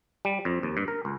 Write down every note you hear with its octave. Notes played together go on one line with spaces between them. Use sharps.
G3
F2
D#2
G2
A#4
C#2